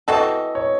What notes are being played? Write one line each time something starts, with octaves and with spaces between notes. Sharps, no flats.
E3 C4 F#4 A4 D#5
C#5